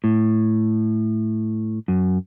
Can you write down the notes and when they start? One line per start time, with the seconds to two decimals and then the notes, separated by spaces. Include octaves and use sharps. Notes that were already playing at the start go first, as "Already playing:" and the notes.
0.04 A2
1.88 F#2